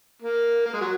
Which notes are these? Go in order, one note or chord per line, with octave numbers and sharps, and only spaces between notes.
A#3
A#3
G#3
F#3